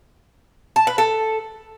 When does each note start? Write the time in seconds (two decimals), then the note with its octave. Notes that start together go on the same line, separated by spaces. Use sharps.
0.76 A5
0.87 B4
0.98 A4